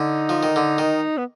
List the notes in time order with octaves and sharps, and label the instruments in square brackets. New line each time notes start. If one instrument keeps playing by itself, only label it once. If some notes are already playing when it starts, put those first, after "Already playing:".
Already playing: [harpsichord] D3 [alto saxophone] D#4
[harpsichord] F3
D#3
D3
D#3
[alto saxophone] B3